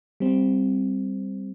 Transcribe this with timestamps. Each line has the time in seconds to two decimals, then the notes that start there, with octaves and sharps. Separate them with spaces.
0.20 G3 C4